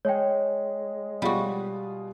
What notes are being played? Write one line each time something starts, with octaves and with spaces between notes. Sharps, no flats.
G#3 C#5 G5
B2 G3 F4 F#4 G#4